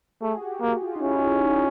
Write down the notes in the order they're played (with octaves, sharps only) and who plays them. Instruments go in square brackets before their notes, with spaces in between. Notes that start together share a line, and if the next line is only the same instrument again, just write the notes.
[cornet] A3 [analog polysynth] G#4
[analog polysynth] F#4
G4
[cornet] A#3 [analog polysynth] F#4
[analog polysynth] F4
D#4
[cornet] C#4 [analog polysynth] E4
[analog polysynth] D#4